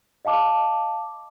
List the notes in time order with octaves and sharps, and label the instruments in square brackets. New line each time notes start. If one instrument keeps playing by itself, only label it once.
[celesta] D#5 F5 A5 D6